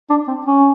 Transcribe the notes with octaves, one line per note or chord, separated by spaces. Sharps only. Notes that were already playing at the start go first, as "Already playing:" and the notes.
D4
C4
C#4